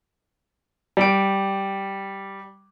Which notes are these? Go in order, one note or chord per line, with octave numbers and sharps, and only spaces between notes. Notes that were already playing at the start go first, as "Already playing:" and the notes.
G3 D7